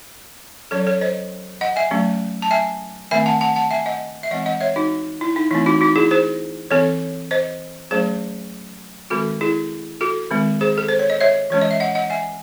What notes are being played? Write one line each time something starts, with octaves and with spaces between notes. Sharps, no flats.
F#3 C#4 A4 C#5
A4 C#5
C5 D#5
D#5 F#5
E5 G#5
F#3 A3 C#4
A5
E5 G#5
D#3 A3 C4 E5 G#5
F#5 A5
F#5 A5
F#5 A5
E5 G#5
D#5 F#5
E5
E3 G#3 C4 D#5 F#5
D#5 F#5
C#5 E5
D#4 F#4
E4
D#4
E3 A3 C4 E4
D#4 F#4
D#4 F#4
E4 G#4
G#4 C5
E3 C4 A4 C#5
C5 D#5
F#3 A3 C#4 G#4 C5
D#3 G#3 C4 F#4 A4
E4 G#4
F#4 A4
D#3 G#3 C4
G#4 C5
A4
C5
C#5
D#5
C#5 E5
E3 G#3 C#4 C#5
D#5
E5
D#5 F#5
D#5 F#5
E5 G#5